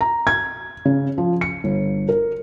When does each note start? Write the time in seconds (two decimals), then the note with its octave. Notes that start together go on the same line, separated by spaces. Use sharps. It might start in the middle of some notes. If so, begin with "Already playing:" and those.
0.01 A#5
0.27 G#6
0.85 C#3
1.18 F3
1.41 C#7
1.64 G1
2.09 A#4